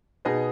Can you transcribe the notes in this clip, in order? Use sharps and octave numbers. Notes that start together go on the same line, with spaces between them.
B2 B3 D#4 G#4 D#5